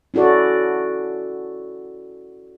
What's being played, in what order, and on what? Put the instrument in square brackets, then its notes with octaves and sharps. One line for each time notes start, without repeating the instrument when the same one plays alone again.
[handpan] C#4 E4 F#4 A4 D5